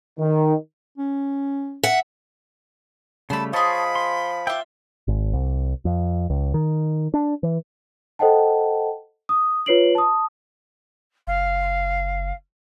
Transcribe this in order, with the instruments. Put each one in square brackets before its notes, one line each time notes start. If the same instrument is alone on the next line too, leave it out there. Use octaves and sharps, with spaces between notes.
[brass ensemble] D#3
[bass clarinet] C#4
[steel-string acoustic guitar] E5 F#5
[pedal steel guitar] C#3 G3 A3 [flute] A5 [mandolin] B5 C6
[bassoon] F3 [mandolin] G#4 D#5 [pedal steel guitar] C#5 A5 C6 [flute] B5
[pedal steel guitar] C6
[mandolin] F4 E5 [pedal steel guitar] G5 D6
[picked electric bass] G#1
C2
F2
C#2
D#3
D4
E3
[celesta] A4 C5 D#5 F#5 G5 A5
D#6
F4 B4 C#5 C7 D7 F#7
A5 D#6
[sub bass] F#1 [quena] F5